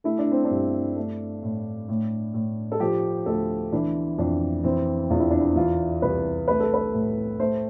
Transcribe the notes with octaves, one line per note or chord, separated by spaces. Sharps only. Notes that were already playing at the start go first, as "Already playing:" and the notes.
A3 E4
D4
C4
D4
G2
A3
A2
A2
A2
A4
F3 G4
D2 A4
E3 D4
F2 D4
E3 C4
E2 F4
E4
D4
E4
E3 F4
C2 B4
A3 B4
A4
B4
A2
A3 C5